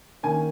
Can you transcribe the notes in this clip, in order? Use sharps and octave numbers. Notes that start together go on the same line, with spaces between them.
D#3 A#3 C#4 G#5